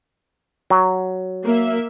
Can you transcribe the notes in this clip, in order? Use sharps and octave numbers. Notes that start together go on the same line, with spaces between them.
F#3
A#3 E5